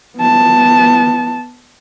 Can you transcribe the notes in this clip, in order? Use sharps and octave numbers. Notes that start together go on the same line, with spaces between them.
B3 A5